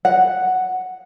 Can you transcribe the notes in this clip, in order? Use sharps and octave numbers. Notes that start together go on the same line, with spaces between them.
F#5